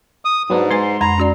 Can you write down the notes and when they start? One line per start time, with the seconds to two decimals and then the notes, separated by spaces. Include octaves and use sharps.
0.25 D#6
0.50 G#2 F#3 B3 D4
0.71 G#3 B4 G#5 C6
1.01 F2 G#3 A#5 B5
1.18 C#4 F#4 D5